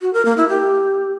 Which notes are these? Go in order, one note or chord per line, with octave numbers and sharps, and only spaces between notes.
F#4
A#4
A#3
E4
G4